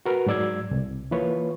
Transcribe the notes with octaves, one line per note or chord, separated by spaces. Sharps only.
F#4 A#4 B4
G#2 F#3 D5 E6 G#6
C2
E3 A#3 F4 B4 C#5